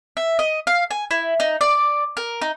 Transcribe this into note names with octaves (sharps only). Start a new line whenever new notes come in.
E5
D#5
F5
G#5
E4
D#4
D5
A#4
D#4